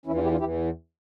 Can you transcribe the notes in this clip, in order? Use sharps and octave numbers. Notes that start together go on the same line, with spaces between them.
E2 E3 C#4 E4
D4 F4
E4 G4
D4 F4
E2 E3 E4 G4